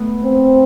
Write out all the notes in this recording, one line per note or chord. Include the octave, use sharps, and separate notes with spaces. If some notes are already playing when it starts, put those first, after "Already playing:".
Already playing: A3 B3
C4